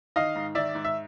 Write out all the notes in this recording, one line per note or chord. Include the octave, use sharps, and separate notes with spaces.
D#3 D#5 F5
G#2
D#3 D5 E5
G#2
E5